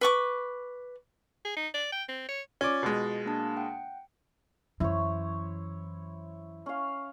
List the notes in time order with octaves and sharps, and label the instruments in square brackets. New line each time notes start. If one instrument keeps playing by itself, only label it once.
[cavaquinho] B4 C#6 D6
[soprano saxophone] G#4
D#4
D5
G5
C4
C#5
[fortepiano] C#4 D5 [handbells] F4 A6
[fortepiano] B2 G#3
[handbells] A#3 D4 A5
F#5 G5
[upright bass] F#2 E3 [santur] E4 C5 C#5
[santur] C#4 F5